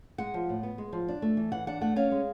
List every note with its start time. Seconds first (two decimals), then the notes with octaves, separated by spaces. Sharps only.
0.18 G#3 F#5
0.34 F3
0.49 A2
0.63 B3
0.78 G#3
0.93 F3
1.08 D4
1.22 A3
1.37 E3
1.52 E3 F#5
1.67 D4 F#5
1.81 A3 F#5
1.96 C#4 F5
2.11 G#3